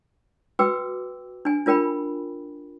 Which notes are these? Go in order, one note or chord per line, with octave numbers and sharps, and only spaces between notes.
F#4 B4 G5 D6 E6
D4 G#5
D4 F4 A#4 G5 B5